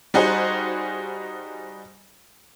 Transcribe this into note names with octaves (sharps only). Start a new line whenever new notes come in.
G3 D#4 F#4 G#4 C5